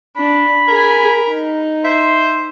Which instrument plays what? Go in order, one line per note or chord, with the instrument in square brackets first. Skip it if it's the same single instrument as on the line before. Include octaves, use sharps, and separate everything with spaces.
[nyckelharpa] D4 [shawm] B5
[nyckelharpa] G#4 G#5 [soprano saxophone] A#4
[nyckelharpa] D#4
[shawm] C5 [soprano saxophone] E5